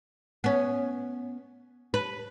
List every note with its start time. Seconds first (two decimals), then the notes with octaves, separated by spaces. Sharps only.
0.44 B3 C#4
1.94 B4